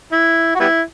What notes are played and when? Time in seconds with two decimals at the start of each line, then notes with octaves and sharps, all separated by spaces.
0.12 E4
0.55 F#4
0.60 G3 B3 E4